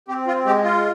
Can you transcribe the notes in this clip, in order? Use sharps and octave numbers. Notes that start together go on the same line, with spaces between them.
C4 G4
F4
G#3 G4
F4